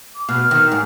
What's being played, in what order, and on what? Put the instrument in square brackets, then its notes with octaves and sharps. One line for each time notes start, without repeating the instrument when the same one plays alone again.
[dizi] D6
[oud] B2 [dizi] F6
[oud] D#3
G#2